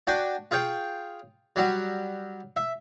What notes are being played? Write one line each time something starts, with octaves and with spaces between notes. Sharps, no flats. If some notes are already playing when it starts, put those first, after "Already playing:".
D4 F#4 G5 G#5
F4 G#4 C#5 G5
F#3 G3 F#4
E5